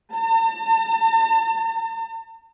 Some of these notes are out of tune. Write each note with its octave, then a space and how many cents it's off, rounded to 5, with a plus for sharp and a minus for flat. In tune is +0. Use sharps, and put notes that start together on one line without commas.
A5 +45